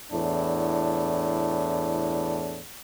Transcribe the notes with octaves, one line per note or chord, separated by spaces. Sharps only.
E2 A2 D4